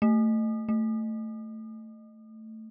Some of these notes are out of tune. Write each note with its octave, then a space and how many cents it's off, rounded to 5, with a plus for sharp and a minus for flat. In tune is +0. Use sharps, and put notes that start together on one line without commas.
A3 +15
A3 +10